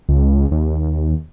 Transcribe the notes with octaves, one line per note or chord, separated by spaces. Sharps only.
C#2
D#2